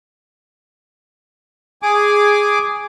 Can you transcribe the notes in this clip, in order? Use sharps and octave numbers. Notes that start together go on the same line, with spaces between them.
G#4 G#5 D6